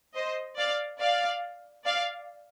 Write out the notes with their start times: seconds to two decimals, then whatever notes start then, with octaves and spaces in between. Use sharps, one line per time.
0.15 C5 D#5
0.58 D5 F5
1.01 D5 F5
1.86 D5 F5